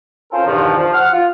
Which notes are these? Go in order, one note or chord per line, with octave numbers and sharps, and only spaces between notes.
C#4 F4 A4 A#4 C5
E2 G2 B2 D#3 F3
F3
F#5 F6
F4